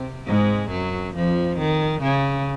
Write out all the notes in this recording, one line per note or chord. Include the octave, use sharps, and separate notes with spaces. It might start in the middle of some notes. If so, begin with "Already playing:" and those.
Already playing: C3 C4
G#2 G#3
F#2 F#3
F2 F3
D#3
C#3